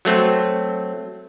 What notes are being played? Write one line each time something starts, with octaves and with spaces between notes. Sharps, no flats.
F#3 A3 C4